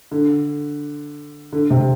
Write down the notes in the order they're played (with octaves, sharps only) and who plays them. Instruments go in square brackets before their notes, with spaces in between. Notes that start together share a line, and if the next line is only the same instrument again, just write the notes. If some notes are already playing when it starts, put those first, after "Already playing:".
[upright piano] D3
D3
C3